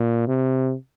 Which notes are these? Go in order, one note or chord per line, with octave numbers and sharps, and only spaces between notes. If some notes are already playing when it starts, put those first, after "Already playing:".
Already playing: A#2
C3